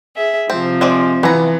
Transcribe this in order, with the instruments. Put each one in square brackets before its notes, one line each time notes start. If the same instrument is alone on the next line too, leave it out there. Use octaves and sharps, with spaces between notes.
[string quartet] G#4 E5
[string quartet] C3 F3 [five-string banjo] C4
[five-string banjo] G#3 C4 D5
[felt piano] E3 [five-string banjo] B3 A#5